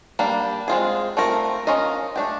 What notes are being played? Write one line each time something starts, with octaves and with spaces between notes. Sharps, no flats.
G3 A#3 D4
G#3 C4 F4 G#4
A3 C4 F4 A#4
C#4 F4 A#4 D#5
A3 D4 G4